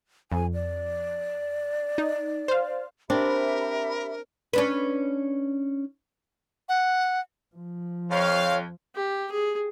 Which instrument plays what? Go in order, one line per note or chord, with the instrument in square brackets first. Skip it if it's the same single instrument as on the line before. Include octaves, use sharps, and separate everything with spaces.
[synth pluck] F2 [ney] G#5
[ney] D5
[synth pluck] D#4
C5 F5
[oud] C4 [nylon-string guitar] D4 [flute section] G4 E5 B5 [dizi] A#4
[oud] C#4 D4 B4
[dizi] F#5
[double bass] F3
[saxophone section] F2 [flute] C#5 [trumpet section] F5
[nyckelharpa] G4
G#4